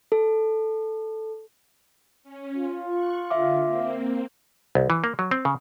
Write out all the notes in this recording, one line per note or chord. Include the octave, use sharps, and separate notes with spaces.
A4
C#4
F4
C#6 F#6
D3 E5 F5 D6
A#3 C4
C2
E3
A#3
F#3
C4
C#3